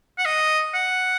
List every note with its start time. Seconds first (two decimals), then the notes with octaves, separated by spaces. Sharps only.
0.18 F#5
0.25 D#5
0.74 F#5